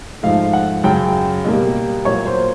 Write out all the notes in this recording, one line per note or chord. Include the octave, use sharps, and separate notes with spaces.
G#2 F3 A3 F5
F#5
F#2 C#3 F#3 G5
B2 G3 A#3
A#2 F#3 A#3 C#5
C5